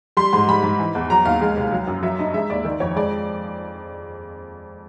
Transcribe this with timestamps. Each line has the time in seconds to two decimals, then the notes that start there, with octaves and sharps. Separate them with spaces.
0.17 G3 C6
0.33 G#2 C6
0.48 G3 B5
0.63 G#2
0.79 E3
0.95 E2
1.10 F#3 A#5
1.25 D#2 F5
1.41 G#3
1.57 C2
1.72 F#3
1.87 F#2
2.03 F#3 E5
2.19 G2 D#5
2.34 G#3 E5
2.50 D#2 D5
2.65 D#3 D5
2.80 F2 C#5
2.96 G#3 D5